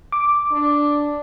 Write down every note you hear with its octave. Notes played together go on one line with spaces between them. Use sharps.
D6
D4